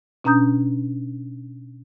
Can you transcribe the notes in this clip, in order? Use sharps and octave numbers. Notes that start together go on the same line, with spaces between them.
B2 C#4 D4 A#5 D#6 G6